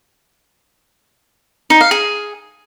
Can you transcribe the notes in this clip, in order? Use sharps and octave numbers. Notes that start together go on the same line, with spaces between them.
D#4
F5
G#4